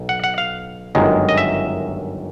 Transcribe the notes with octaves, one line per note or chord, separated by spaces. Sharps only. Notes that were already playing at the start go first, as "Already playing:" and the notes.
Already playing: B1
F#5
F#5
F5
G1 F#2 D#3 G#3
D#5
E5